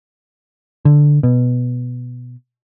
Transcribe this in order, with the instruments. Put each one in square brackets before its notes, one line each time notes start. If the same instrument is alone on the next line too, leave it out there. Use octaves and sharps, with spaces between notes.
[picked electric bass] D3
B2